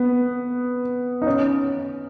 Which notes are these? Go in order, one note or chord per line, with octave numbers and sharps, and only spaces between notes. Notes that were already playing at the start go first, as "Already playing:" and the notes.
Already playing: B3
D#4
C#4